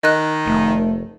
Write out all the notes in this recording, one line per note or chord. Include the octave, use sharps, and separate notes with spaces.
D#3 D#5 F#6
F1 A3